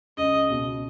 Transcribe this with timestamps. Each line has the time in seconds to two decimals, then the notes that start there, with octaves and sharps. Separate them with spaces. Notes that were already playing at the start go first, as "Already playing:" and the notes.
0.17 C#2 C#3 D#5
0.50 B2